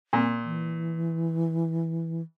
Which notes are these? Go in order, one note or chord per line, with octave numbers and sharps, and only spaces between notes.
A#2
E3